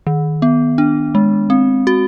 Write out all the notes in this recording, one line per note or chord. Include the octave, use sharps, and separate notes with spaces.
D#3
B3
D4
G#3
C4
F#4